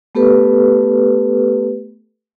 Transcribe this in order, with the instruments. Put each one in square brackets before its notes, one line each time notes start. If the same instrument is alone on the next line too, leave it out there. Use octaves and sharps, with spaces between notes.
[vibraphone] A3 B3 G4 A4 B4